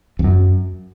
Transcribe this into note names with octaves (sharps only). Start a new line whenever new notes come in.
F2
F#2